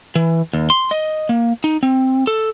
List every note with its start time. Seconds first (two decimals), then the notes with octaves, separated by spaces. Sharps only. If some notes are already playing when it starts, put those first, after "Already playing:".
0.15 E3
0.53 D#2
0.70 C6
0.91 D#5
1.29 A#3
1.64 D#4
1.83 C4
2.27 A4